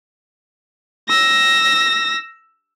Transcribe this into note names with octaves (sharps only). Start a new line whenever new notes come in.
E6 A#6